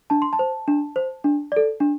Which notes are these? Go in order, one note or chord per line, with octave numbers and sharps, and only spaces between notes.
D4 A5
C6
A5
C5
D4
C5
D4
A4 D5
D4